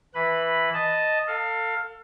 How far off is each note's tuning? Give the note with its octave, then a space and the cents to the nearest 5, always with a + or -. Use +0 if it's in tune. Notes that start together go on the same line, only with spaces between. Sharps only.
E3 +0 B4 +0 B5 +0
D#5 +0 A5 +0
A4 +35 F5 +10